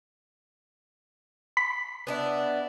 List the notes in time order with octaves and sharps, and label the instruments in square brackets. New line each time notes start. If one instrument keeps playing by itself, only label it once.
[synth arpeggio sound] B5 B6
[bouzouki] B3 D4 E4